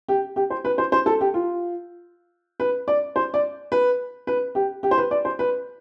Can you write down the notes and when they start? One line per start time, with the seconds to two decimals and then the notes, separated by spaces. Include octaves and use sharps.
0.08 G4
0.36 G4
0.50 C5
0.65 B4
0.78 C5
0.92 C5
1.06 A4
1.21 G4
1.34 F4
2.60 B4
2.88 D5
3.16 C5
3.34 D5
3.72 B4
4.27 B4
4.55 G4
4.83 G4
4.91 C5
4.98 B4
5.11 D5
5.25 C5
5.39 B4